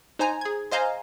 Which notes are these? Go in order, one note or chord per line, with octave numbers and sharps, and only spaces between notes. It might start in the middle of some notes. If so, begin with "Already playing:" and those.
D#4 C5 G#5 A#5
G#4 G#6
C5 D#5 F5 G#5 A#5